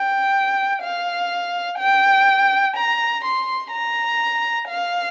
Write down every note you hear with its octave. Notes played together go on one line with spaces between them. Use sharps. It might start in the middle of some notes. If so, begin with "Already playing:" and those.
Already playing: G5
F5
G5
A#5
C6
A#5
F5